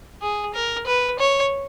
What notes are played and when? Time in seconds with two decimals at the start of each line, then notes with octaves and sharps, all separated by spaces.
0.22 G#4
0.54 A#4
0.87 B4
1.19 C#5